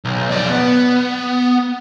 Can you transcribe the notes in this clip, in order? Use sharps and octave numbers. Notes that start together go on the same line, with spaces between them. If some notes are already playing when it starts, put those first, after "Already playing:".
B1
F2 D5
B3